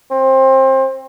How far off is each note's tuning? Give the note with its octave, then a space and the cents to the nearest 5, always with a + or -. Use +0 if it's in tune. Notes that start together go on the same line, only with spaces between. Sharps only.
C4 +25